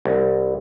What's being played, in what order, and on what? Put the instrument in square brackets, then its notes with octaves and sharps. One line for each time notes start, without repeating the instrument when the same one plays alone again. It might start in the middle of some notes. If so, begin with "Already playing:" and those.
[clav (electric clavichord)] C2